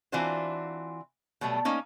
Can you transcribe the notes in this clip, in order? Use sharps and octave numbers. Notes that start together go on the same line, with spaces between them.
E3 C4 D4 F4 F#4 C5
B2 F#3 G3 A3
A#3 C#4 D#4